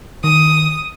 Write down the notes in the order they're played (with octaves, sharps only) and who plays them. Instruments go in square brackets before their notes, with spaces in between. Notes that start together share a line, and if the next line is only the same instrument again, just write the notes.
[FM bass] D#3 [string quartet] D#6